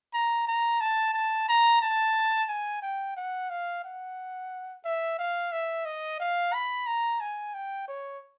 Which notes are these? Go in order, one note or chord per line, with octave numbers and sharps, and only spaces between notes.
A#5
A#5
A5
A5
A#5
A5
G#5
G5
F#5
F5
F#5
E5
F5
E5
D#5
F5
B5
A#5
G#5
G5
C#5